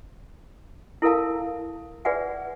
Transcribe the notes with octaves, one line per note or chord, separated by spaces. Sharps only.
E4 A4 A#4 F5 A5
G#4 B4 D5 E5 F#5 G#5